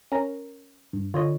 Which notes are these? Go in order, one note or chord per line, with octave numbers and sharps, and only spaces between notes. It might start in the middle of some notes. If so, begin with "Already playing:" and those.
C#4 A#4 A#5
G2
D3 F4 C#5 D#5